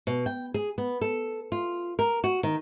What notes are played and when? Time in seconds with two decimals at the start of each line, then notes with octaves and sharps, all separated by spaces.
0.07 B2
0.26 G5
0.54 G#4
0.78 B3
1.01 A4
1.52 F4
1.99 A#4
2.24 F#4
2.43 D#3